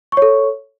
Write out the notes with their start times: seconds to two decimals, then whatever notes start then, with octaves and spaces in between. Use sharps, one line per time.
0.12 C#6
0.17 C#5
0.22 A4